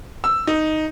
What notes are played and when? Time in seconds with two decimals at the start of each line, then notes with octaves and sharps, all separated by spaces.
0.24 E6
0.47 D#4